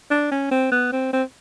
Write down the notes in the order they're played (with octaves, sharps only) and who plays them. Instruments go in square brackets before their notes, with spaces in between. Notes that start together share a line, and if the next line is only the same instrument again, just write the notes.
[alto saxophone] D4
C#4
C4
B3
C4
C4